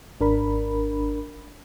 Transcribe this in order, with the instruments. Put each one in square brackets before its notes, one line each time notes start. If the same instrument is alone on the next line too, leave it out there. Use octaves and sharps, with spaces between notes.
[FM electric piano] G#1 D4 A#4 B5